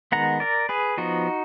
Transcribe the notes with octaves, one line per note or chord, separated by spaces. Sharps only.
D#3 G#3 B3 F#5 A#5
A#4 D5
G#4 B4
F3 B3 D#4 F#4